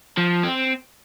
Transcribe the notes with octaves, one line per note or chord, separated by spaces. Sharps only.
F3
C4